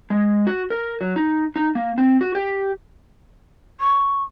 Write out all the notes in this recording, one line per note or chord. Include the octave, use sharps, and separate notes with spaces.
G#3
F#4
A#4
F#3
D#4
D#4
A#3
C4
F#4
G4
C#6